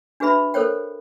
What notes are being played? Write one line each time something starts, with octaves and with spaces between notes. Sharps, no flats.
D4 F#4 G#4 B4 E5 B5
A4 A#4 C5 C#5 G5